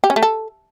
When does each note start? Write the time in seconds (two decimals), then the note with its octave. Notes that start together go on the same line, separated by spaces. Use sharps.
0.04 G4
0.10 C#4
0.16 A3
0.23 A4